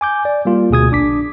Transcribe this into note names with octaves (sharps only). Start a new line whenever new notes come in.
G#5 D6 G6
D5
G3 A#3 F4
D2 B2 G#4 D#6 G#6
A#1 D4 D6 B6